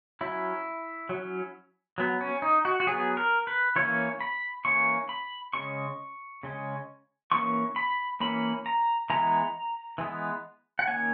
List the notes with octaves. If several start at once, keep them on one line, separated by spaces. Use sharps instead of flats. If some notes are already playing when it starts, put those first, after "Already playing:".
F#3 C#4 E4
F#3 C#4
F#3 B3
C#4
D#4
F#4
F#4
F#3 B3 G#4
A#4
B4
E3 A#3 C#4 C#5
B5
E3 A#3 C#4 C#6
B5
C#3 G#3 C#4 C#6
C#3 G#3 C#4
E3 A#3 C#4 C#6
B5
E3 A#3 C#4 B5
A#5
E3 G#3 B3 A#5
E3 G#3 B3
F#5
D#3 A#3 C#4 G#5